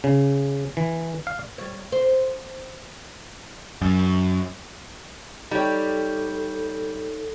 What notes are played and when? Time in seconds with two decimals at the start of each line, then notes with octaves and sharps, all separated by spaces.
0.04 C#3
0.77 E3
1.27 F5
1.58 G3 C#5
1.92 C5
3.82 F#2
5.51 G3 D#4 G4 A4 C#5